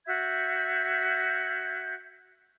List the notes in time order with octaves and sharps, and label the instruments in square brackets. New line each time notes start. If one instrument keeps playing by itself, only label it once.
[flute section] F#4 E5 G6 G#6